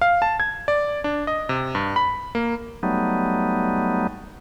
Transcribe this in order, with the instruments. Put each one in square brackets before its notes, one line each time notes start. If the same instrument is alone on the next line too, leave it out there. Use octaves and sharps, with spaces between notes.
[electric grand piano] F5
A5
G#6
D5
D4
D#5
C3
G2
B5
A#3
[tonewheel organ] F#3 G3 A3 B3 D#4